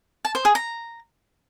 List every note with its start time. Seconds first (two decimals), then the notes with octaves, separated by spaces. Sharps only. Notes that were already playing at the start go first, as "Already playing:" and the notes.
0.25 A5
0.35 C5
0.45 G#4
0.55 A#5